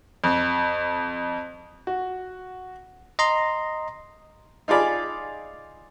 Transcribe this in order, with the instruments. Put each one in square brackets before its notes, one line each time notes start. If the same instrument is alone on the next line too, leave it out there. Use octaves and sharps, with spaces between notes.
[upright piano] F2
F#4
[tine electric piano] D#5 A#5 C6
[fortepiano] D#4 F4 G#4 D5 B5